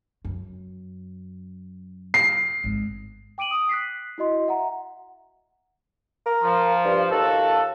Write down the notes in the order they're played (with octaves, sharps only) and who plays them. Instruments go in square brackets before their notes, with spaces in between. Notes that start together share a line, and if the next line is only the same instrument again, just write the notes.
[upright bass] F#2
[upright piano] C7
[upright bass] G#1 G#3
[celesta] G5 D6 D7 D#7 F#7
D#6
F#6 B6 C7
E4 F#4 D#5 C6
E5 F#5 A#5
[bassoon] A#4
[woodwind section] F3
[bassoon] G2
[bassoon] D#2 [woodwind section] F4 F#4 A4